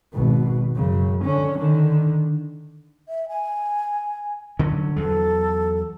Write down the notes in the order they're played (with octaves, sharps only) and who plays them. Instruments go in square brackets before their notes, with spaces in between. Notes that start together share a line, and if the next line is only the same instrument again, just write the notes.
[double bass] G#1 B2
F#2 C#3
D3 C#4
D3 D#3
[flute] E5
G#5
[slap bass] D3 F#3 C#4
[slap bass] E2 F#3 [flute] A4